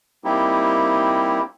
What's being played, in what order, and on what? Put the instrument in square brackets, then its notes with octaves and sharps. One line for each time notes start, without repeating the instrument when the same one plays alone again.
[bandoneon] G3 A#3 C4 D#4 E4 G4